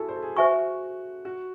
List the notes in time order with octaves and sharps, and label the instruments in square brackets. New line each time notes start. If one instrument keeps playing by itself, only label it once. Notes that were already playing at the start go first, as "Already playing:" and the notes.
Already playing: [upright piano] E4 F#4 G#4 A4
C5
A4
G#4
[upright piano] F#4 [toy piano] C5 E5 G#5 C#6
[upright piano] F#4